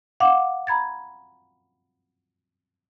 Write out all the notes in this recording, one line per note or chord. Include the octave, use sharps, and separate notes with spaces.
F5 F#5 D6
A#5 B5 G#6 A6